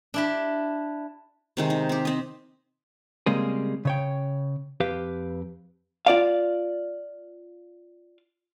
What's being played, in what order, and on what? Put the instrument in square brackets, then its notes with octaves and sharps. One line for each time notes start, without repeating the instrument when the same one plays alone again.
[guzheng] D4 E4 G4
[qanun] C3 D#3 G#3
D#4
C4 G4
C4 D#5
[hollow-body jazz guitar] C#3 G3 G#3 A#3 C4 G#4
C#3 C#5 G5
F2 G4 B4 F5
F4 D5 F5